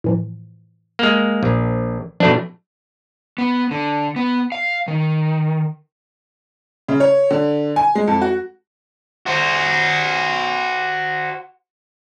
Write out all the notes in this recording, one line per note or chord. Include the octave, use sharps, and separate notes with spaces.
A2 E3 F3
G#3 A#3
A#1
B2 F3 A3 D4
B3
D3
B3
F5
D#3
C#3
C#5
D3
G#5
G#3
F2
F#4
F#4 C5